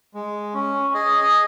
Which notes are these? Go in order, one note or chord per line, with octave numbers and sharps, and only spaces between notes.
G#3
C#4
G#4 D#5